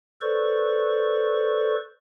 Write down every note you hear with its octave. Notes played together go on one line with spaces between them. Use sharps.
A4 B4 C5 D5 C#6